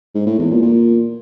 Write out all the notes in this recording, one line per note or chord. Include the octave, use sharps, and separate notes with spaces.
G#2
A2
E2
A#2
A#2